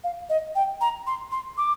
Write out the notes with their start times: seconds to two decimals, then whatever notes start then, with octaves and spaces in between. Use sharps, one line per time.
0.04 F5
0.29 D#5
0.55 G5
0.81 A#5
1.07 C6
1.32 C6
1.57 D6